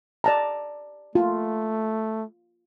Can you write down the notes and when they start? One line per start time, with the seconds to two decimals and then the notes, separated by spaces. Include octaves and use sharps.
0.24 D5 A5 A#5
1.15 A3 F4